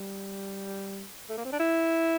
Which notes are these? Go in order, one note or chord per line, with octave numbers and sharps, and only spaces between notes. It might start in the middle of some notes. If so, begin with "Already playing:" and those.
Already playing: G3
A3
A#3
C4
D4
E4